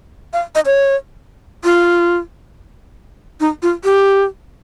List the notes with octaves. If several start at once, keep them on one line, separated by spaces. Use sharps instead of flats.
F5
D#5
C#5
F4
D#4
F4
G4